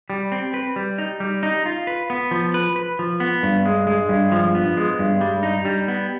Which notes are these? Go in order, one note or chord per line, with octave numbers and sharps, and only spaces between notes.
G3
C4
B4
G3
D#4
G3
D#4
F4
B4
B3
F3
B4
B4
F3
B3
G2
G#3
G#3
G2
F3
B3
G#3
G2
G3
D#4
G3
B3